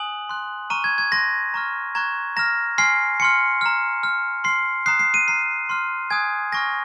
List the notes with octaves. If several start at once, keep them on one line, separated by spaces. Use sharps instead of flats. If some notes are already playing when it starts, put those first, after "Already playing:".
Already playing: G#5 D#6 F#6 F#7
C6 F#6
A#5 C#6 F6 D#7
G#6
G#6
C6 F#6 A#6
A#5 C#6 F6
A#5 C#6 F#6 G#6
A#5 F6 A#6
G#5 C6 F6 C7
G#5 C6 F6 C#7
A#5 F6
A#5 F6
C6 F6 C7
A#5 D#6 F#6 C7
C7
D#7
A#5 F6 C7
C6 F6
G#5 D#6 F#6 G#6
G#5 C#6 F6 A#6